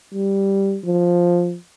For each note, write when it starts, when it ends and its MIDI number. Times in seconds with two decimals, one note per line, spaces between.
0.13 0.79 55
0.84 1.57 53